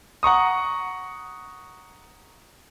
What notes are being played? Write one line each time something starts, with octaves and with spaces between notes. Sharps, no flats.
F#5 A#5 C#6 D#6